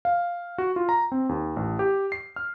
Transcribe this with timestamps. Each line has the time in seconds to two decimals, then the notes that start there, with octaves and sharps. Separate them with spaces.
0.05 F5
0.58 F#4
0.76 F4
0.89 A#5
1.12 C4
1.29 D#2
1.56 A1
1.79 G4
2.12 C7
2.36 F6